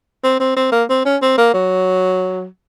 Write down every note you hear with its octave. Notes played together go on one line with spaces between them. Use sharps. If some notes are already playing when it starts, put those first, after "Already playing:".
C4
C4
C4
A#3
C4
C#4
C4
A#3
F#3